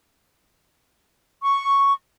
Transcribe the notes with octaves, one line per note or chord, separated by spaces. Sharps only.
C#6